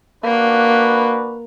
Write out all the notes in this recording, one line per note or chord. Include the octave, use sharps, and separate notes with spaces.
A#3 D4 F#4 B4